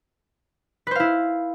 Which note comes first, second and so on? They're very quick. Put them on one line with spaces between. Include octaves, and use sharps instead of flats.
B4 C5 F5 E4